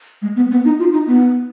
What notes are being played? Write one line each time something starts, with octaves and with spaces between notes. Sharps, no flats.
G#3
B3
B3
D#4
F4
D#4
B3